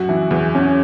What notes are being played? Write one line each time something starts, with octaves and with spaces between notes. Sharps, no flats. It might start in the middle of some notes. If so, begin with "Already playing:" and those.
Already playing: F#2 F#4
E3
E2
C#4